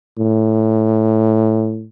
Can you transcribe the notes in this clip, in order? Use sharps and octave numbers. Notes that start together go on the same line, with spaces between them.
A2